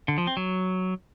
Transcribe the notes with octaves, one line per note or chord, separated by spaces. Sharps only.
D3
F3
C4
F#3